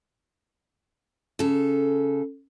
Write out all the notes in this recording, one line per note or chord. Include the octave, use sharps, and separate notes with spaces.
C#3 A4